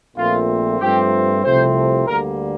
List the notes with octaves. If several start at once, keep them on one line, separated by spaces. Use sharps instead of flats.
A#1 A#2 A3 C4 F4
G2 F3 A3 C4 G4
C2 C3 F3 A3 C4 C5
D2 D3 G3 A#3 A#4